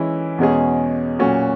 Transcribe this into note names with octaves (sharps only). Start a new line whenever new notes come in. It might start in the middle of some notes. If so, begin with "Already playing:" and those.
Already playing: E3 G#3 C#4 E4
E2 B2 G#3 C#4 G#4
A#2 F#3 C#4 F#4